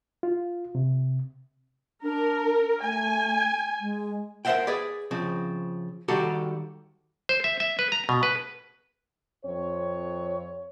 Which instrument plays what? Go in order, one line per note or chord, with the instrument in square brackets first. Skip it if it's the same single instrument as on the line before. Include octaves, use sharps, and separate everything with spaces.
[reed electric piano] F4
C3
[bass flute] D4 [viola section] A#4
[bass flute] A3 [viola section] G#5
[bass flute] G#3
[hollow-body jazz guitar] A#4 C5 D#5 E5 F#5 G5
G#4 B4 D5
C#3 F3 C4
D#3 G3 F#4 G4 A4
[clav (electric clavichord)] C5
E5
E5
B4
A#5
B2
B4
[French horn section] F2 C4 C#5